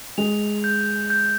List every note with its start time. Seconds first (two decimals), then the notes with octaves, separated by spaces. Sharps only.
0.18 G#3 F7
0.64 G6
1.10 G6